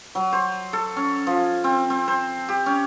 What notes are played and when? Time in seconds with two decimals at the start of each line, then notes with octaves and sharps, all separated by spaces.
0.15 F#3
0.33 C5
0.73 A4
0.96 C#4
1.27 F3
1.64 C4
1.90 C4
2.08 C5
2.49 G4
2.66 C#4